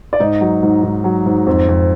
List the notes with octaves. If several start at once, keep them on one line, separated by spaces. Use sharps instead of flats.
D5
G#2 D#4 D#5
F#3
G#2
G#2
F#3
G#2
F2
F2